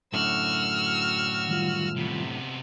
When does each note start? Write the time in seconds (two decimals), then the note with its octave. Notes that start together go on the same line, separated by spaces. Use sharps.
0.14 F#2 A2 D3 F#4 E6 F6
1.49 D#3 G3 F4
1.96 C3 B3